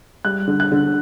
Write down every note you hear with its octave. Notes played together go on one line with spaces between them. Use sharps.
G3 F#6
D3
F#6
D3